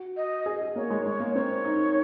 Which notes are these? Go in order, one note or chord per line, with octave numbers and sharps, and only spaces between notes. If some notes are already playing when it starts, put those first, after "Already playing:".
Already playing: F#4
D#5
G#4
G#4
A#3 C#5
G#3
G#3 C#5
A#3
C4 C#5
D#4